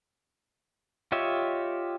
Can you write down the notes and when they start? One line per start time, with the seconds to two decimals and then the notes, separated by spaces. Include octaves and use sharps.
1.12 F4 G4 C#5 D#5 E5